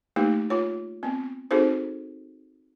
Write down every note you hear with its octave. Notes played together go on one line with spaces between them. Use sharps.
A3 A#3 D#4 G4
F4 C#5
B3 C4
C4 D#4 F#4 G#4 A4 C5